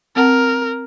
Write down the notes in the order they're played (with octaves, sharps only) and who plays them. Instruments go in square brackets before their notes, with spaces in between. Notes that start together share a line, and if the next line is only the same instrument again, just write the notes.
[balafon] C4 F#5 A5 [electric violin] A#4